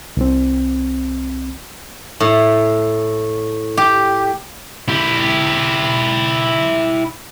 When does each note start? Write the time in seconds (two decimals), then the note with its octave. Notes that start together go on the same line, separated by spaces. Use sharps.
0.17 C2 C4
2.20 A2
3.77 G4
4.88 E4 G4